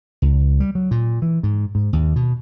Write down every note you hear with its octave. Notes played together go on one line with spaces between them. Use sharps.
C#2
G3
F#3
A#2
E3
G#2
G#2
D#2
B2